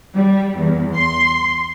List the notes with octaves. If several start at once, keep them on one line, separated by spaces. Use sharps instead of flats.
G3
E2
C6